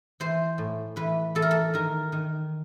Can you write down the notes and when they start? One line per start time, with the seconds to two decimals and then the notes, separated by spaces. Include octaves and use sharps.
0.20 E3 C5
0.58 A2
0.96 E3 B4
1.35 E3 A4
1.42 A#4
1.51 A4
1.74 D#3 A#4
2.12 D#3